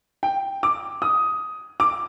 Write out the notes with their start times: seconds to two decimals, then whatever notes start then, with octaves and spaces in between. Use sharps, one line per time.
0.23 G5
0.63 D6
1.02 D#6
1.80 D6